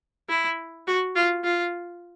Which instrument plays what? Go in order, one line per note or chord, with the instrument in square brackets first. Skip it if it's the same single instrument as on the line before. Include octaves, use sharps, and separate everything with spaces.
[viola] E4
F#4
F4
F4